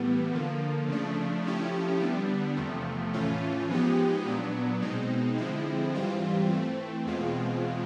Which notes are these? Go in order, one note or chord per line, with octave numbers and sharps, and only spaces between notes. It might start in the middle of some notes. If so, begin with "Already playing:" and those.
Already playing: A2 E3 G3 B3
D3 F3 A#3
C#3 F3 A3 D4
F3 A3 C#4 E4 G4
D3 G3 B3 D4
E2 C3 F3 A3
A2 E3 A3 C#4 F4
F3 G#3 B3 D#4 G4
A#2 F#3 B3 D4
B2 G#3 C4 D#4
D3 F3 G#3 C4 E4
G#2 E3 G3 C4 F4
E3 A3 C4
E2 B2 G#3 C4 F4